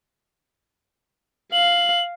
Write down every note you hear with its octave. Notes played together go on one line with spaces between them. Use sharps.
F5 F#7